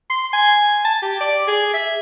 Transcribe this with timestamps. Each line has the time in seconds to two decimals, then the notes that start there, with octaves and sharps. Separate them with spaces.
0.10 C6
0.33 G#5
0.85 A5
1.02 G4
1.20 D5
1.48 G#4
1.74 E5